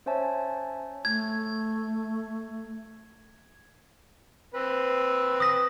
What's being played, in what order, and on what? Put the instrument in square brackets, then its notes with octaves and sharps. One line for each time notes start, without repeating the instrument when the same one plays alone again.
[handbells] C#4 C5 C#5 E5 G#5 A5
[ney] A3 [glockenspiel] G#6
[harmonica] C4 B4
[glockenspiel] D#6 A#6